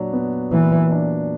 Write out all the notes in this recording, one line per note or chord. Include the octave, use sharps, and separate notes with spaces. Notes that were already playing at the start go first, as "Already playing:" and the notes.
Already playing: A#2 F#3 D4
B3
A#2 E3
D4